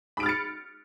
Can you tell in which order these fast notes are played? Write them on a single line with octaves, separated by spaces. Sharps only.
B5 D7 F6 A6 C#7